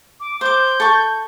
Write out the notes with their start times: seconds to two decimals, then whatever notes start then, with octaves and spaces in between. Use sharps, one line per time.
0.20 D6
0.41 C5 D6 G6
0.80 A4 C#6